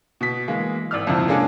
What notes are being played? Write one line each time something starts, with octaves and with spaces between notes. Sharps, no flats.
B2 B6
E3 G#3 A#3
G#1 D5 E6 F6
C2 F2 G#2 C3 F3 C4
G#3 A#3 C#4 D4 G#4 A4